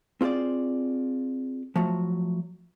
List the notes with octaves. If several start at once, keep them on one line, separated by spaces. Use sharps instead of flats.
C4 F4 G#4 C5 D5
F3 F#3 A3